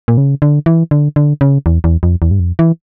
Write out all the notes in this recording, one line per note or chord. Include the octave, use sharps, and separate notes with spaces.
A#2
C#3
D3
E3
D3
D3
C#3
E2
E2
F2
E2
G2
F2
E3